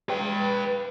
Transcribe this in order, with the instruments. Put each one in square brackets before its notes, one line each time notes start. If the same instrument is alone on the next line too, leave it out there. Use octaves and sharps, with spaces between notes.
[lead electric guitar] B4 G5